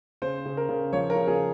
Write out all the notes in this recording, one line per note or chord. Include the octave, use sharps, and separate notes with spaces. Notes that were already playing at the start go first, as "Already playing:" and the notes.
C#3 C5
C#3
A#4
C#3
F3 C#5
A#4
C#3
G#4